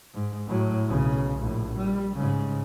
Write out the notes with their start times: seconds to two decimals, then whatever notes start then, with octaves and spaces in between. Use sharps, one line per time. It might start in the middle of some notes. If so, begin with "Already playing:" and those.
0.14 G#2
0.47 A2 F#3
0.88 B1 C#3
1.39 A#1 A2
1.75 G3
2.16 G#2 C#3